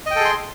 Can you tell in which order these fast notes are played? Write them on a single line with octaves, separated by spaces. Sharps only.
D#5 G5 A4 G#4 C6